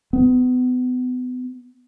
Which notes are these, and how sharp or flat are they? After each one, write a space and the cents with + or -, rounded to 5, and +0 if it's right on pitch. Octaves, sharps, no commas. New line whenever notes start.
B3 +30